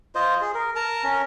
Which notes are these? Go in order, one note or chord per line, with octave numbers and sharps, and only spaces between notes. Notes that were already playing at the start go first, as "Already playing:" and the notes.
F4 C5 D#5
G#4
A#4
A#4 A5 A#5
C#4 A#4